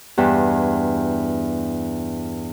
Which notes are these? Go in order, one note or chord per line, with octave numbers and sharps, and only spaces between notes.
E2 G2